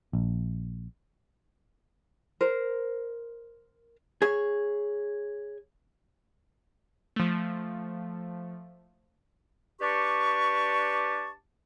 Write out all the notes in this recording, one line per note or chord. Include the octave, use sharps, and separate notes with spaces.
A#1
A#4 C5
G#4 C#5
F3 A3
D4 G4 B4 D5 A5 C#6